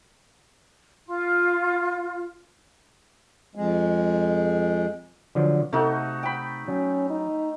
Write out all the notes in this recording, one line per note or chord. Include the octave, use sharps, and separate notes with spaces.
F4
F2 G#3
D3 F3 F#3
C3 A3 D#4 F#4
G5 B5
F#3 C#4
D#4